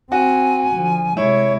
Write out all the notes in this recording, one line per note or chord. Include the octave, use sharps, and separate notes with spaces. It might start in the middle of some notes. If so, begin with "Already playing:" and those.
C4 F#4 G#5
D3 F3
C3 G#3 E4 C#5